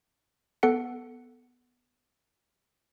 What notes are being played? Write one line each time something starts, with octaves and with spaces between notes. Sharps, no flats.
B3 A4 F#5 C#7